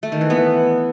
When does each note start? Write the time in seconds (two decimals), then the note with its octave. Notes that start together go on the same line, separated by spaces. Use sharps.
0.03 A3
0.12 D#3
0.21 E3
0.30 B3